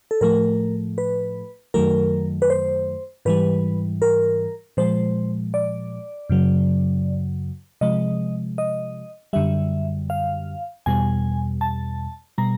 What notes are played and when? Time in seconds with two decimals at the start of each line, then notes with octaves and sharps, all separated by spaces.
0.11 A4
0.21 A2 F3 A3 A#4
0.98 B4
1.74 F#2 D#3 F#3 A3 A#4
2.42 B4
2.50 C5
3.25 G#2 E3 G3 B4
4.02 A#4
4.77 A#2 F3 G#3 C5
5.54 D5
6.30 F#2 C#3 F#3
7.81 C3 F3 G#3 D#5
8.58 D#5
9.33 F#2 D3 G3 E5
10.10 F5
10.86 E2 B2 G3 G#5
11.61 A5
12.38 B2 G3 A#5